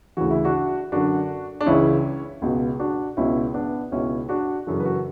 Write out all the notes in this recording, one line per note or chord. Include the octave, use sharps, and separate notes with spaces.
D2 C#3 E3 F#4
E4
D4 F#4
F#2 D3 D4 F#4
D4
C#2 C#3 E3 C#4 E4
C#2 B2
D4 F#4
C#2 B2 C#4 E4
B3 D4
C#2 B2 C#4 E4
D4 F#4
F#2 C#3 E3 F#4 A4
B4
F#4 A4